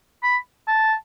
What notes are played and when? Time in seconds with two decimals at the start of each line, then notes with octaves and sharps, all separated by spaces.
0.23 B5
0.68 A5